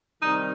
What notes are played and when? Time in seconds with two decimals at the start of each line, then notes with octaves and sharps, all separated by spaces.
0.22 C3 D#3 G3 D#4